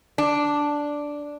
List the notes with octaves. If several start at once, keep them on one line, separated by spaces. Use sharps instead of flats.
D4